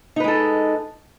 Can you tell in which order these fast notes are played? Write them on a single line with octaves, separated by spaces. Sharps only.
D#4 B4 G#3 A4